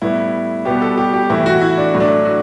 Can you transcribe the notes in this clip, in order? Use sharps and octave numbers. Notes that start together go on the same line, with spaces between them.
A2 G3 B3 E4
B2 G3 B3 G4
A4
G4
G4
A2 E3 A3 E4
F#4
E4
D4
A2 F#3 A3
D4
F#4